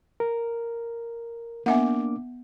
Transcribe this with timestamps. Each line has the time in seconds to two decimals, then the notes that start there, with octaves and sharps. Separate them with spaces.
0.20 A#4
1.66 A#3 B3 D4 E5 F#5 D6